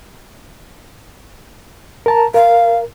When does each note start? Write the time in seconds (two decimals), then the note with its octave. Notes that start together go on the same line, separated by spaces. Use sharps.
2.06 A#4 A5 A#5
2.34 A#4 F5